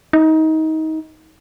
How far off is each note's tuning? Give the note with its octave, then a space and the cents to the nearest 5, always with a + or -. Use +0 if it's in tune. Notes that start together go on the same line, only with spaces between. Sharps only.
D#4 +25